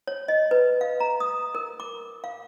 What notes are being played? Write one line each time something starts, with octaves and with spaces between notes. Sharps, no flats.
C#5
D#5
B4
F5
A#5
D#6
A#4
D6
F5